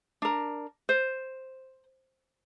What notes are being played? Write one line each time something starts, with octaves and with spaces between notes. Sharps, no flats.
D4 A#4
C5